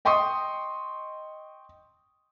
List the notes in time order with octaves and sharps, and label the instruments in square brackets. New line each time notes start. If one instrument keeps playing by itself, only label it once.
[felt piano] D#5 G5 C6 C#6 D#6